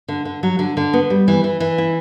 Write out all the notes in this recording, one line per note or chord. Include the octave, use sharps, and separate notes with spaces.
D3
D3
F#3
D3
D3
B3
G3
E3
E3
E3
E4